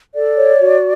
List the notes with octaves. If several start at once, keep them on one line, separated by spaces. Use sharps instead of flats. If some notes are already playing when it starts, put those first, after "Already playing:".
A4 D5
C#5
F#4